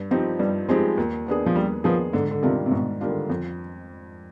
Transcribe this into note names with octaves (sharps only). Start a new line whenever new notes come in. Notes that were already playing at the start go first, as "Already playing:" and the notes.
Already playing: G2
F3 C4 D#4 G4
G2 G3
F3 G#3 C4 D#4 G4
D#2
D#3 B3 D4 G#4
F3
D#2 G3
D#3 F3 B3 D4 G#4
G#2 D3
D3
C3 D#3 G3 D4 F4
C3
G#2 B2
D#3 G3 D4 F4
D3
F2